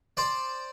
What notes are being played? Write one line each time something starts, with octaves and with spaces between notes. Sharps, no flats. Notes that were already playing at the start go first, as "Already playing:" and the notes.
C5 D5